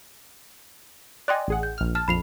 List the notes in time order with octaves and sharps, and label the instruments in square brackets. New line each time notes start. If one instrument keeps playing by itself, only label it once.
[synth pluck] D5 D#5 G#5 [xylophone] G5 C6 F#6
[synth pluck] A1 G#4 F#5
[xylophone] G6
[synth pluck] A#1 F6
[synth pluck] A5 [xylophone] F6
[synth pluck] A#1 F2 [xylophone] B5 C7 F7